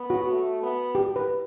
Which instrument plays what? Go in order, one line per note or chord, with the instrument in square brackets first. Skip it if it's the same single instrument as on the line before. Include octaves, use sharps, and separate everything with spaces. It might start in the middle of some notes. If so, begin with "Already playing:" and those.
Already playing: [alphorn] B3
[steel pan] F#4
[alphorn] A3
B3
[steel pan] G4
B4